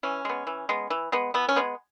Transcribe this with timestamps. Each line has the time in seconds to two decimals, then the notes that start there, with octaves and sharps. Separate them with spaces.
0.03 E3 C#4
0.25 G#3 B3
0.47 E3
0.69 G#3 B3
0.90 E3
1.12 G#3 B3
1.34 E3 B3
1.49 C#4
1.56 G#3 B3